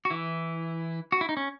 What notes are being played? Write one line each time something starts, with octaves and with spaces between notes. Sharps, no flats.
F#4
E3 E4
F#4
E4
D#4
C#4